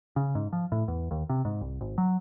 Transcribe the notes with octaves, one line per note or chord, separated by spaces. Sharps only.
C#3
G#2
F3
A2
E2
D#2
C3
G#2
C2
G#1
F#3